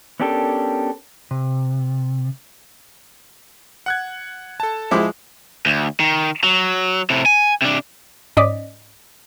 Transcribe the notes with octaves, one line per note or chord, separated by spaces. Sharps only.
B3 C#4 D4 G4 A4 A#4
C3
F#5 F#6 G#6
A4 A5
F3 G#3 E4 C5 E5 D6
D2
D#3
F#3
A2 C3
G#5
C3 D4
G#2 C#4 D5 D#5 D6 B6